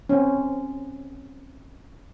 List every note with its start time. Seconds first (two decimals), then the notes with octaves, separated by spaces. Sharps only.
0.09 C4 C#4